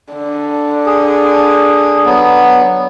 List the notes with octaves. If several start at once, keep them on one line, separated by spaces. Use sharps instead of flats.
D3
G#4
F#3 B3